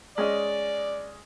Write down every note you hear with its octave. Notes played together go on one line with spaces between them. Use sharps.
G#3 C#4 D5 D#5